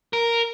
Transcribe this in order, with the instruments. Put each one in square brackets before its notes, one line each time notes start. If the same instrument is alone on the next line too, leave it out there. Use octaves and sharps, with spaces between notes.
[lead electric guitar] A#4